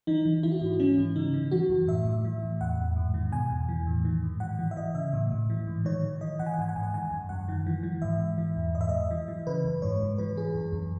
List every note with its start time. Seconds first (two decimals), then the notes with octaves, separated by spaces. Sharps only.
0.07 E3 D#4
0.25 E3
0.43 E3 E4
0.52 F#4
0.59 G#2 E4
0.80 E3 C#4
0.98 G#2
1.16 C#3 D#4
1.34 E3
1.51 E3 F#4
1.69 F#2
1.87 A2 E5
2.05 A2
2.25 E3
2.43 A2
2.61 E2 F#5
2.79 E2
2.96 G#2
3.14 D#3
3.32 B2 G#5
3.51 E2
3.69 E3
3.86 A2
4.05 D#3
4.23 G#2
4.40 E3 F#5
4.59 E3
4.71 E5
4.76 E3 D#5
4.94 C#3 E5
5.13 A2
5.32 A2
5.50 E3
5.67 G#2
5.85 D#3 C#5
6.03 D#3
6.21 E3 D#5
6.39 E3 F#5
6.46 G#5
6.54 F#5
6.58 G#2 G#5
6.69 F#5
6.76 G#2 G#5
6.83 F#5
6.94 D#3 G#5
7.11 F#2
7.29 F#2 F#5
7.48 D#3
7.66 E3
7.83 E3
8.02 G#2 E5
8.20 G#2
8.38 E3
8.56 E2
8.75 G#2 D#5
8.81 E5
8.89 G#2 D#5
9.11 E3
9.28 E3
9.47 C#3 B4
9.64 F#2
9.82 G#2 C#5
10.01 G#2
10.18 E3 B4
10.36 E3 G#4
10.55 F#2
10.72 F#2